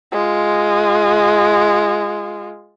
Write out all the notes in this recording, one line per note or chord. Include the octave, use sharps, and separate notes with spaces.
G#3 F4